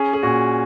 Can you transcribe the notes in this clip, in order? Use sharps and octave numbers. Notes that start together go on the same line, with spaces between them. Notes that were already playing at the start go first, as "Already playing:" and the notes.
Already playing: C#4 G#4
G#4
A#2 F#4